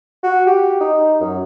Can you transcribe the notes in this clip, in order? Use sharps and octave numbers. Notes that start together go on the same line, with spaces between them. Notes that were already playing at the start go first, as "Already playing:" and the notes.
F#4
G4
D#4
F#2